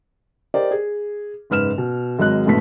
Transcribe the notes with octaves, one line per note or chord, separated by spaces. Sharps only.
G4 A#4 C5 D5 D#5
G#4
F#1 G#2 B4 F6 E7
B2
G#1 F#3 G#3 D#5 F#6
A1 G#2 B2 A3 B3 B6